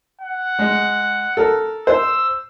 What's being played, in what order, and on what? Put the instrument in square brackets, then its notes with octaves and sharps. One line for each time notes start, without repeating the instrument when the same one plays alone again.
[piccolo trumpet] F#5
[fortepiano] G#3
A4 A#4
[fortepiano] C5 [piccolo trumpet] E6